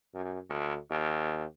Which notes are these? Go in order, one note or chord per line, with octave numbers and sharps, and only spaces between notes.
F#2
D2
D#2